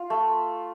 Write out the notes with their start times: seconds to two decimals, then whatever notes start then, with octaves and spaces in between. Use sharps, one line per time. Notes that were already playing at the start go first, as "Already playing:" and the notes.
Already playing: F4
0.10 A3